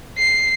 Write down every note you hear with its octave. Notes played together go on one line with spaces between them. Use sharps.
C7